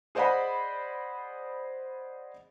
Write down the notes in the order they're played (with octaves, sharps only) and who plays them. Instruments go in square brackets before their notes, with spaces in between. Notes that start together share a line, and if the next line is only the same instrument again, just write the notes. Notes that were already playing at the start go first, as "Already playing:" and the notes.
[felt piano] G#4 C5 D5 D#5 F#5 B5